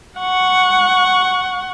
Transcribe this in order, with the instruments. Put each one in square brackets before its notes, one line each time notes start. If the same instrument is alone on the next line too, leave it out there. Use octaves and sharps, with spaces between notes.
[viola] F#5 C#6